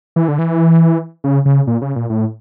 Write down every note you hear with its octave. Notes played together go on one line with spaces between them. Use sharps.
E3
D3
E3
C#3
C#3
A#2
C#3
A#2
A2